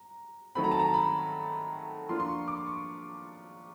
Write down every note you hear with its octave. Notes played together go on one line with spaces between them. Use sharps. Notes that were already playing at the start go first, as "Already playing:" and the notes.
Already playing: A#5
D#3 F#3 A3 C4 B5
A#5
A5
A#5
B5
F3 A#3 D4 F4 C6
C6
C#6
D6
C#6